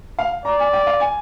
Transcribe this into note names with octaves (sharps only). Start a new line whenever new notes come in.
F5
D5 A#5
G#5
G5
F5
G#5